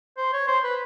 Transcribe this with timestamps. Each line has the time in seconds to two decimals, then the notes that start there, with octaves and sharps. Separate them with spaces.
0.17 C5
0.33 C#5
0.48 C5
0.64 B4